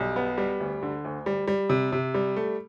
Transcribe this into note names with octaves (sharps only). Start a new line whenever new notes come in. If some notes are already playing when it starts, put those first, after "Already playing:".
Already playing: B1 G3
B3
G3
D2
D3
D2
G3
G3
C3
C3
G3
A3